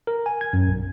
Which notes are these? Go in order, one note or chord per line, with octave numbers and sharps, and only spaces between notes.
A#4
G#5
G#6
F#2
B1